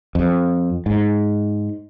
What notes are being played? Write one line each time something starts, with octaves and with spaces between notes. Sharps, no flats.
F2
G#2